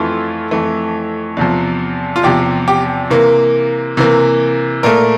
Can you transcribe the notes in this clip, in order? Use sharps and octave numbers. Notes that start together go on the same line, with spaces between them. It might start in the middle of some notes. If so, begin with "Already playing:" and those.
Already playing: F2 E3 A3 F4
F2 E3 A3
E2 C3 F3
F4
E2 C3 F3 G4
G4
C3 E3 A#3
C3 E3 A#3
A#2 A3 A#4